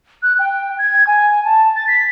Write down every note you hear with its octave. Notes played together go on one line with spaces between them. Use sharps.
F#6
G5
G#6
G#5
A5
A6
B6